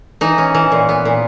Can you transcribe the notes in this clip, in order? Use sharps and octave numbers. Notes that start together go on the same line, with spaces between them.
E3 D#4
C#4
E3
A#2
B3
A#2